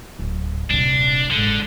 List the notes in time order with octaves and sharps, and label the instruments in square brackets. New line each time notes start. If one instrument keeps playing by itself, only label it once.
[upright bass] D1
[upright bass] D#1 C3 [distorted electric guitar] D4
[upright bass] F#1 G#2 [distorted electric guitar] D3